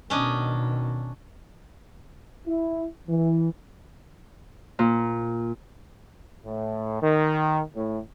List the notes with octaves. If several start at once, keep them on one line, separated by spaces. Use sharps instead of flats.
B2 D#3 C#4 D4 D#5
E4
E3
A#2
A2
D#3
A2